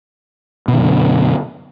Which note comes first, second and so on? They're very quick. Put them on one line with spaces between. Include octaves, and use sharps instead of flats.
B2 D#3 F#2 D3